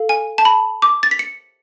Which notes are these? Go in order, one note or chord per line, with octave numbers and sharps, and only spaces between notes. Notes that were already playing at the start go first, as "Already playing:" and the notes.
Already playing: A4 F5
G#5
A5
B5
D6
A6
B6
C#7